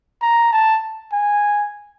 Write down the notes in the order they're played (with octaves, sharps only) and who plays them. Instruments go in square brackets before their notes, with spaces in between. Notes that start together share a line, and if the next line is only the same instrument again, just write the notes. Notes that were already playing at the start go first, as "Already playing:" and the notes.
[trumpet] A#5
A5
G#5